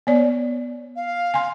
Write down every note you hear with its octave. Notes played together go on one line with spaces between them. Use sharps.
B3 C#5 D5
F5
G#5 C6